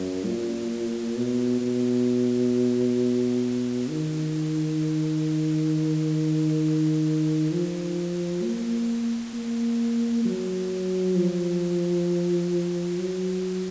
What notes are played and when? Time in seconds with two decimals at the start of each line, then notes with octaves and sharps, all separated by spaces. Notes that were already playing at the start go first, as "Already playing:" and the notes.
Already playing: F#2
0.25 A#2
1.16 B2
1.61 B2
3.89 D#3
7.52 F3
8.44 A#3
9.34 A#3
10.25 F#3
11.16 F3
12.98 F#3